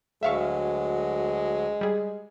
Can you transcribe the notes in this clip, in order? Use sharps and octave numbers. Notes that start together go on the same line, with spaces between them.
D2 F#3 G#3 E5 F5 C#6
G3 G#4